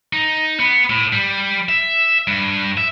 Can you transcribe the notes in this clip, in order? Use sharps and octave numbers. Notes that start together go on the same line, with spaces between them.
D#4
B3
A2
G3
E5
G2
E5